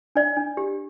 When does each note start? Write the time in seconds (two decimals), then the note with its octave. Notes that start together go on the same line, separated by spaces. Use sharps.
0.16 D4 D5
0.36 D4
0.57 G4